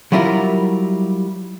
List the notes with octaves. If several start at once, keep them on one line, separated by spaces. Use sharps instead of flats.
F#3 G3 E4 F4 A#4